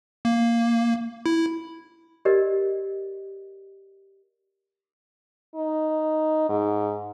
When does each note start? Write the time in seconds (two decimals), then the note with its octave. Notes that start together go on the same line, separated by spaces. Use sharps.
0.25 A#3
1.26 E4
2.25 G4 A#4 D5 D#5
5.55 D#4
6.49 G#2